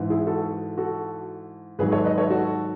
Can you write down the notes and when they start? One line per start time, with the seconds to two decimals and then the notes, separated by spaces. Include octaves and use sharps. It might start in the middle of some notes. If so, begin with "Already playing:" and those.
Already playing: G#2 E3
0.10 E4 G#4
0.27 F#4 A4
0.77 F#4 A4
1.79 G#2 D#3 F#3 G#4 B4
1.92 A4 C#5
2.04 B4 D#5
2.17 A4 C#5
2.29 F#4 A4